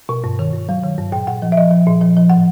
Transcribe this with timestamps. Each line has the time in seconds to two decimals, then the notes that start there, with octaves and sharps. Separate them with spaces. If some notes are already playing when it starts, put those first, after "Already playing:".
0.09 B2
0.24 G2
0.39 D#3
0.53 G2
0.69 F#3
0.83 D#3
0.98 G2
1.12 A#2 G5
1.27 A#2 F#5
1.42 F3
1.52 E5
1.57 F3 D#5
1.71 F3
1.87 A#2
2.01 F3
2.17 F3
2.30 A2 F#5